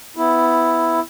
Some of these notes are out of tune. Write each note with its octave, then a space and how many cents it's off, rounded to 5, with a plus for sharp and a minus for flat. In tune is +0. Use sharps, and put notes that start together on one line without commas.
B3 +15 E4 +0